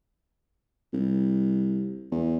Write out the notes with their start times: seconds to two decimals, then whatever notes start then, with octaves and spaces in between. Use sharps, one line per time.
0.93 C2
2.11 E2